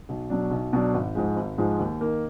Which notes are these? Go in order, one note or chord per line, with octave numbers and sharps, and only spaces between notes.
B1
B2 F#3 D4
B1
B2 F#3 D4
G#1
G#2 F3 G#3
G#1
G#2 F3 G#3
D#2
D#3 A#3